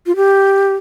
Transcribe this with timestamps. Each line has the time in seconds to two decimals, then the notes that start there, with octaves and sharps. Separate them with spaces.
0.06 F4
0.16 G4